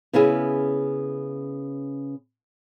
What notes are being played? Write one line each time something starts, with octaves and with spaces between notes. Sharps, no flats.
C#3 B3 C#4 E4 G#4